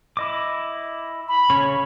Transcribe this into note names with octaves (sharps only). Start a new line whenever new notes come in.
E4 D#5 D6
B5
C#3 C#4 C#5